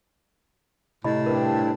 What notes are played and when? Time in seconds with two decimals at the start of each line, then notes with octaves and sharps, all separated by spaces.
1.04 A2 C3 E4 D#5 B5
1.26 G2 C4 D4 A#4 B4